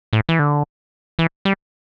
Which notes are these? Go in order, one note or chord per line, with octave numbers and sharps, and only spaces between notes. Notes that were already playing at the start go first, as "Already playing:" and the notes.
A2
E3
D3
E3
G3